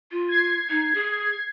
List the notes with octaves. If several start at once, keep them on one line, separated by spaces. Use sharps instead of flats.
F4
G#6 C7
D#4
G#4